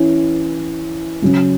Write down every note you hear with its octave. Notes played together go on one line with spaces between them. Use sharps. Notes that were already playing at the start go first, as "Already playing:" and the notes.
Already playing: E3 C#4 E4
C#3 F#3 C#4